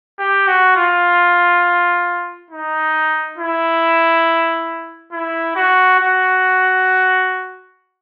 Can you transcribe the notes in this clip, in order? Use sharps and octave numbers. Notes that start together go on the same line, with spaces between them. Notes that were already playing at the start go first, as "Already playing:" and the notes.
G4
F#4
F4
D#4
E4
E4
F#4
F#4